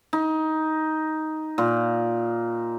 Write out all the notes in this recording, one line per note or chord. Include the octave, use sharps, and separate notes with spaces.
D#4
A#2